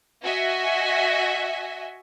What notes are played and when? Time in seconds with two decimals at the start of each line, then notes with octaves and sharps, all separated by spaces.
0.24 F#4 D#5 E5 G#5